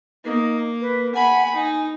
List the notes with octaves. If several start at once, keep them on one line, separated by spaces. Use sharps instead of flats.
A#3 D#4
B4
F#5 G#5 B5
D#4 G#5